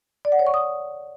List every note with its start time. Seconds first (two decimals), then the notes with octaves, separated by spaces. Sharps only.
0.25 D5
0.32 F#5
0.39 C#5
0.47 C#6
0.54 D#6